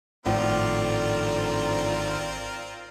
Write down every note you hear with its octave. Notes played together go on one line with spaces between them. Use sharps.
G#1 A2 D3 F3 C4 F4 A#4 D5